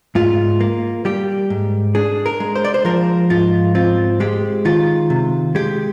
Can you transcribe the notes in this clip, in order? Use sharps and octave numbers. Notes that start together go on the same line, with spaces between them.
G#2 F4
A#3
G3 G4
G#2
D4 G#4
A#4
G#3
C5
D5
C5
F3 A#4
G#2 F4
C4 F4
G#3 G4
D#3 F4
C3
G#3 G4